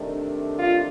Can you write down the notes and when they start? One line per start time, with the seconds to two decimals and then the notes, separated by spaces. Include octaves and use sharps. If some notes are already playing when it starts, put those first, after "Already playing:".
Already playing: C3 D#3 A3 D4
0.57 F4